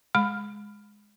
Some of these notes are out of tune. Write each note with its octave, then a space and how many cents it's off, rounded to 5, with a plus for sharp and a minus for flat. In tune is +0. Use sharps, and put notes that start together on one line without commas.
G#3 +0 B5 +20